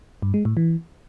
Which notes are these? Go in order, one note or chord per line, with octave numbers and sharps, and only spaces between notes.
G2
G#3
A2
E3